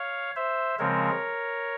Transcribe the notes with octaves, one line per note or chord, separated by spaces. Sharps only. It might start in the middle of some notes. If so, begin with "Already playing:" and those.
Already playing: C#5 F5
C5 E5
C#3 F3 G#3 C4 A#4 C#5